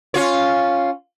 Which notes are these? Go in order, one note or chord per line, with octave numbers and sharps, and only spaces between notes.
C#4 F4 C#5